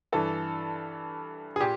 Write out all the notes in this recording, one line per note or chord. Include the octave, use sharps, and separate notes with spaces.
G2 E3 A4
G#4
A#2 G4